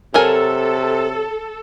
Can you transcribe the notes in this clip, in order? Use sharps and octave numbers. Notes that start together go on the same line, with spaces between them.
C3 F#3 A4 A#4 G#5